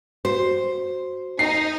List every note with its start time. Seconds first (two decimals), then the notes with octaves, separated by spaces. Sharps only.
0.25 F#4 C5
1.39 D#4 C7